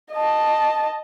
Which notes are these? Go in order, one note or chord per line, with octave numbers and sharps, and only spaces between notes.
D#5 A5